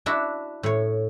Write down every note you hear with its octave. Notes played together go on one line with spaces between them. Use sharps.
D4 E4 F#4
A2 C#5